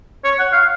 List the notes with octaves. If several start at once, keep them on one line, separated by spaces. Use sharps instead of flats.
C#5
F#5
F5